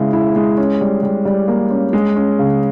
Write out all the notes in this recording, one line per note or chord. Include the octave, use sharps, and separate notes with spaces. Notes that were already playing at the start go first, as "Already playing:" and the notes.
Already playing: C#3 G#3 E4
E4
G#3
C#4
G3
G3
G3
A#3
C#4
G#3
C#4
C#3